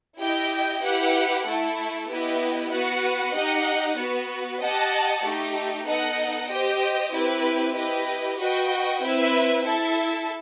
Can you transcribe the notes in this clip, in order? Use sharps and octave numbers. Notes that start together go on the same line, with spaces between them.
E4 G4 D#5 G5
E4 G4 B4 F#5
A3 E4 A4
B3 E4 G4 B4 D#5
B3 F#4 B4 F#5
D#4 G4 D#5 F#5
B3 F#4 B4
G4 D#5 F#5 A5
A3 D#4 G4
B3 D#4 A4 D#5 F#5
G4 C5 D#5 G5
C4 E4 G4 B4
E4 G4 B4 D#5
F#4 B4 D#5 G5
C4 E4 B4 E5
E4 A4 E5 A5